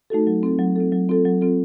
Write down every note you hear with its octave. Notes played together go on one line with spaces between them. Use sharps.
A3 D#4 F#4 A4
F#3
C4 F4 A4
F#3
C4 F4 A4
F#3
C4 F4 A4
F#3
C4 F4 A4